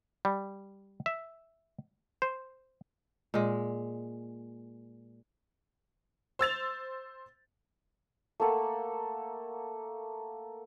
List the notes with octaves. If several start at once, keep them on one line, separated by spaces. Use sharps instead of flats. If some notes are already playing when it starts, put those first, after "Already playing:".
G3
E5
C5
A#2 G#3
C5 E6 A6 F7
A3 A#3 A4 F#5